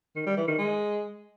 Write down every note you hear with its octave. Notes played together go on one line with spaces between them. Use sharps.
D#3
G3
E3
D#3
G#3